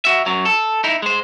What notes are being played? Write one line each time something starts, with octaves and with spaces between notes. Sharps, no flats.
F#4 E5
F#2 F#3
A4
D#4 E4
G#3 C5